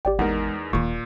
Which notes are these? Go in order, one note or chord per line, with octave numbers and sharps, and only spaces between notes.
G#1 G4 D5 G5
E2 G#3 D#4 A#4 F#5
D1 D#2 A#2 D#3 C#6